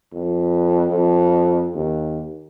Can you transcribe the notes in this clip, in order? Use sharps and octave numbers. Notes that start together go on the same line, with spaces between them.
F2
F2
D#2